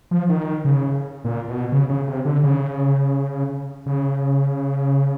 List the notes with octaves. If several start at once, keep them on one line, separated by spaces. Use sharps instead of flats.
F3
D#3
C#3
A#2
B2
C#3
C#3
C3
D3
C#3
C#3